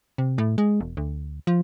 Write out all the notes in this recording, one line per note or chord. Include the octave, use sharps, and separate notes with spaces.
C3
A2
G#3
E1
D2
F3